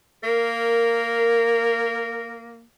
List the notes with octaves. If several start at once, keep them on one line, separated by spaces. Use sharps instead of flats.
A#3 A#4